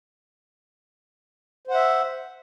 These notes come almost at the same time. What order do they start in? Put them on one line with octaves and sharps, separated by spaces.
C5 F#5 E5